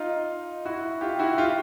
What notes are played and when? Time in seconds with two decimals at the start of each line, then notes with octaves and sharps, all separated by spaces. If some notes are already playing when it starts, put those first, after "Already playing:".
Already playing: D#4 F4
0.65 E4 F#4
1.01 F4 G4
1.19 E4 F#4
1.38 F4 G4